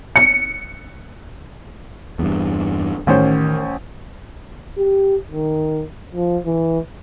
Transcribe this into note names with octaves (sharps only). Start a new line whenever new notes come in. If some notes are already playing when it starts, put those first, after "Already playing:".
C#7
E2 G2
A1 D#3 C#4 C5
G4
D#3
F3
E3